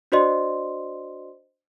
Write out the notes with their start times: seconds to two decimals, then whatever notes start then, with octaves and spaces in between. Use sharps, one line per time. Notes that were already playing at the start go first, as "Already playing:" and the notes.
0.12 D4 F#4 C5 D5 D#5 C6